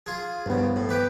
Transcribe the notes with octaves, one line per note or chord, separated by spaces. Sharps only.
F4 G#4
C2 G2 C#3 B3
A2
G4 B4 G5